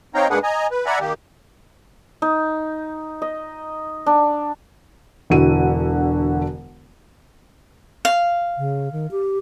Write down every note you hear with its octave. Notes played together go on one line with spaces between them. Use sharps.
C4 D#4 C#5 F5 G5 A#5
G#2 A#3 D4 G#4 B4 F#5
D#5 G#5 A#5
B4
D5 E5 F#5 G#5 A#5 B5
D#3 A#3 G4
D#4
D#5
D4
E1 D3 E4 F#4 D#7
F5
C#3
D#3
G4